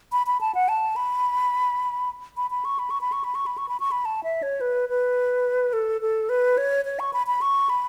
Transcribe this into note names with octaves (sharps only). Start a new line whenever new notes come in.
B5
B5
A5
F#5
A5
B5
B5
B5
C#6
B5
C#6
B5
C#6
B5
C#6
B5
C#6
B5
C#6
B5
A5
E5
C#5
B4
B4
A4
A4
B4
C#5
C#5
C#6
B5
B5
C#6
B5